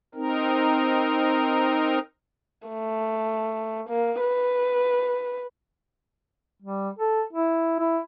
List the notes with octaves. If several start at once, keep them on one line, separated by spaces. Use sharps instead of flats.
C4 D#4 A#4
A3
A#3
B4
G3
A4
E4
E4